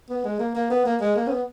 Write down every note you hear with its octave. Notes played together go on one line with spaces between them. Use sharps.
B3
G#3
A#3
A#3
B3
A#3
G#3
A#3
C#4
B3